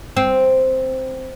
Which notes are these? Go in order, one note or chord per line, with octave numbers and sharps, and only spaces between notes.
C4